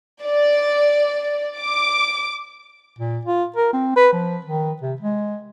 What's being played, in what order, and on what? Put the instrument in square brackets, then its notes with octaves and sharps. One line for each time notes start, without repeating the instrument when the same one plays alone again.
[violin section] D5
D6
[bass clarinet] A#2
F4
A#4
C4
B4
F3
D#3
C3
G#3